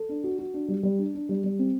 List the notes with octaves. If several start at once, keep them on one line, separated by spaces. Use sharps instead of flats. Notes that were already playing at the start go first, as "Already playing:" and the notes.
Already playing: A4
D4
F#4
F#4
D4
G3
G3
D4
D4
G3
G3
C4